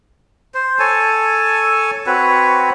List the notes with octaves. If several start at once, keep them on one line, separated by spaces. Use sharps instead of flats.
C5
A4 C#5 G#5 A5
C4 F#4 B4 C#5